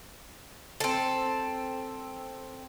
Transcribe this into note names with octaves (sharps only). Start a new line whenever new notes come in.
C4 A4